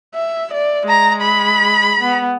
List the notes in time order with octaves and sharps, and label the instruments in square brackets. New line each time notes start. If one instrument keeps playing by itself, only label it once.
[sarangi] E5
D5
[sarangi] G#3 [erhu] A#5
[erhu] B5
[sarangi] B3